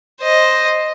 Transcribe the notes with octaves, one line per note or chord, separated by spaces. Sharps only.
C5 D#5